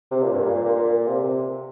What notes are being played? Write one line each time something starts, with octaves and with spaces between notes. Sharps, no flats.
C3
A#2
G2
A#2
A#2
A#2
A#2
C3
C3